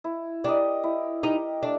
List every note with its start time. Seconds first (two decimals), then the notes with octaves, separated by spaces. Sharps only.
0.04 E4
0.44 D4 G4 A#4 D#5
0.84 E4
1.23 D#4 G4 A#4 D#5
1.63 A3 D4